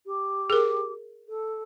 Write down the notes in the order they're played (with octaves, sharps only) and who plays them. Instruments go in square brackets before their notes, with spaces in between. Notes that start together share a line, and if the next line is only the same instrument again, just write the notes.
[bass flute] G4
[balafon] G#4 A#4
[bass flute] A4